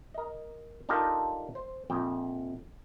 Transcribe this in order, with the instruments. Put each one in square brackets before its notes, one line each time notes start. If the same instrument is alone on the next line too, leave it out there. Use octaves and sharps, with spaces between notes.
[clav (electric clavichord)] A#4 D#5
D4 D#4 F4 G4 A4 A#4
C5
A#1 F2 G5